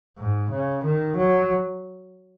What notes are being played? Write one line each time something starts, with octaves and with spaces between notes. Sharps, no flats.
G#2
C#3
D#3
F#3